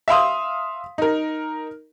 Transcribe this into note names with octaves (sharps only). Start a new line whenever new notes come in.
E5 F5 C6 D#6
D#4 A#4